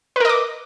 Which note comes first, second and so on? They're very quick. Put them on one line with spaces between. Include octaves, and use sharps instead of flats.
B4 A#4 D#5 D6